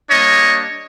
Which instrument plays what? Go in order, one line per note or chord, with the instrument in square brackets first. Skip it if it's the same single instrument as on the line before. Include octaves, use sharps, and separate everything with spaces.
[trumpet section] G3 A#3 D4 C#5 D#5